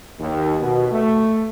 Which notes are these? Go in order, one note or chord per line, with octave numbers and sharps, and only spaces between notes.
D#2
B2
A3